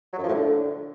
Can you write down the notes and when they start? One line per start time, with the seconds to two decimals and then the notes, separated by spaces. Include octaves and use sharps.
0.13 F#3
0.18 F#2
0.23 F3
0.28 A2
0.34 D3